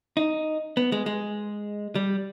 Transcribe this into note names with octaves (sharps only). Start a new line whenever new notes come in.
D#4
B3
G#3
G#3
G3